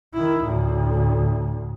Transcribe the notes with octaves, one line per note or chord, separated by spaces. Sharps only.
D#3 E4
D2 A2